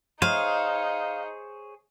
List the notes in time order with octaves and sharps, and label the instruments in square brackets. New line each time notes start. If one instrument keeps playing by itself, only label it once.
[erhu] D#4 [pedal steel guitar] G#4 C5 C#5 [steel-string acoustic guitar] F5